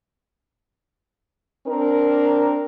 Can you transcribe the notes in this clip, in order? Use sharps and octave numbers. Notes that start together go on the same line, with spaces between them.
C4 D4 A#4